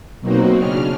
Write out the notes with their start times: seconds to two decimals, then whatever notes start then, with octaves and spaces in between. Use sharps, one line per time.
0.21 B2 F#3 A#3 C4 D#4 F#4
0.56 C#3 C#4 D4 F6